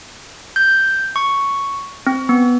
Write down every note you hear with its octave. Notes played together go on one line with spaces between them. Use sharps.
G6
C#6
C4
B3